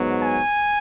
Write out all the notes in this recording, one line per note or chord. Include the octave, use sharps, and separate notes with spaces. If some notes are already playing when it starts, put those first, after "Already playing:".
Already playing: G#2 F#3 B3
G#5